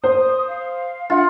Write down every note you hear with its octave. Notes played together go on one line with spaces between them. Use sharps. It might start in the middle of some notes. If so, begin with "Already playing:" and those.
C5 D#6
F5
D4 F4 E5 F#5